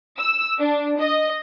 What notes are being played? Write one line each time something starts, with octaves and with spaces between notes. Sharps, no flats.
E6
D4
D#5